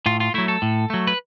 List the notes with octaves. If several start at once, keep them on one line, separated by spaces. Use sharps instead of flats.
A2 F4
F4
F#3 A3 E4
A4
A2
F#3 A3
B4